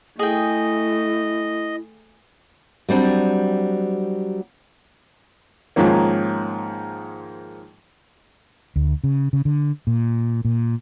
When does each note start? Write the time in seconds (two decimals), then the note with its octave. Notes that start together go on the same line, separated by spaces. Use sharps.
0.19 A3 E4 G#4 D#5 G5
2.89 F#3 G3 C4 D4
5.76 G#2 D#3 F3 A#3 C#4
8.76 D2
9.04 C#3
9.33 C#3
9.45 D3
9.87 A#2
10.45 A#2